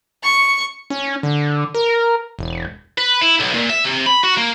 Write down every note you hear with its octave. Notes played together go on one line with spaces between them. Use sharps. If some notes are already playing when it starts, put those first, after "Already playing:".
C#6
C#4
D3
A#4
E1
B4
E4
B1
A#2
E5
C3
B5
F#4
A#3